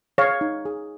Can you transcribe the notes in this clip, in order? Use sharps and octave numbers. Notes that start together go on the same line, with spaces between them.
G#4 C#5 F5
D#4
G#4